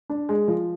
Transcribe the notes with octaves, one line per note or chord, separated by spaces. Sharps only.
D4
G#3
F3